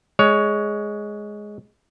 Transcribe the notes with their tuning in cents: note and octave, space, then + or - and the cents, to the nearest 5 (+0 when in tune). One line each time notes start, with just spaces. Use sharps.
G#3 +5 C#5 +15